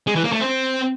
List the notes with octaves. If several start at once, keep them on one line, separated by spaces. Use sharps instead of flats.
G#3
E3
A#3
A3
C4